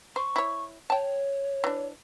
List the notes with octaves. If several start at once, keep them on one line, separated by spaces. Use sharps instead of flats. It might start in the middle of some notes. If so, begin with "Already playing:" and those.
C5 C#6
E4 C#5
C#5 G5 A5
E3 D4